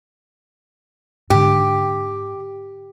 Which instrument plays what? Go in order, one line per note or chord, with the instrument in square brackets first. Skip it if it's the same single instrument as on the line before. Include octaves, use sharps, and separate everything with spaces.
[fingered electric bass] G#2 D3 [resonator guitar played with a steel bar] G4